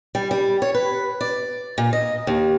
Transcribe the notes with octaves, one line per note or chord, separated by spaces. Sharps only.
G3
G3
C#5
B4
D5
A#2
D#5
D#2